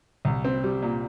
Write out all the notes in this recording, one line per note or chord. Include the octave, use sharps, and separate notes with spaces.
C2
C4
G3
A#2